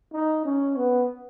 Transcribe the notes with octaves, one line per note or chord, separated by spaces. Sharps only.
D#4
C#4
B3